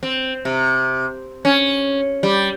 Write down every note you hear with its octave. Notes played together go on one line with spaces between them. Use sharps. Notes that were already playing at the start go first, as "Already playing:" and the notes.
C4
C3
C#4
G3